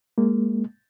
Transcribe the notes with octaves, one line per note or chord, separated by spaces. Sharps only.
G#3 A#3